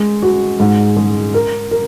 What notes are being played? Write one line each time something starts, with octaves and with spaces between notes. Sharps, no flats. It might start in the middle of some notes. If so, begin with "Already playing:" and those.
Already playing: G#3
F#4
G#2
G#3
A#4
A#4